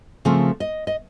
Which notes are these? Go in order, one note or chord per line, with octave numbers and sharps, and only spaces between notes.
C#3 F3 A3 C4 A#4
D#5
D#5